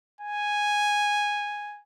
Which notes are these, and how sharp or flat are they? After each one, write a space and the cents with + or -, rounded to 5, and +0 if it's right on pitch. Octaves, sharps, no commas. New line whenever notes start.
G#5 -5